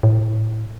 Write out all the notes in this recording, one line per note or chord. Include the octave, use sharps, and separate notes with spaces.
A2